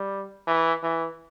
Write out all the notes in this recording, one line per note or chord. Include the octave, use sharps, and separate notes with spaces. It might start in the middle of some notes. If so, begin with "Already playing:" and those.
Already playing: G3
E3
E3